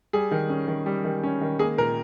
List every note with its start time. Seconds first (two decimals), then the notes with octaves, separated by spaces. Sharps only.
0.13 G3 G#4
0.31 D#3
0.50 C#4
0.68 D#3
0.86 G3
1.05 D#3
1.24 C#4
1.41 D#3
1.59 A#3 G#4
1.78 A#2 A#4